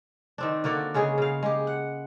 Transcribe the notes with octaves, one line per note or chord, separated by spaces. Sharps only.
D#3 C4 D4
D3 A#3 F#4 D5
C#3 G#3 G#4 C#5
C#3 F5
G#3 G4
F#5